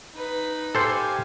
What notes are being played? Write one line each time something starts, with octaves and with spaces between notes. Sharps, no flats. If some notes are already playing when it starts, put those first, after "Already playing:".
D#4 B4
G4 A4 C5 F5 G#5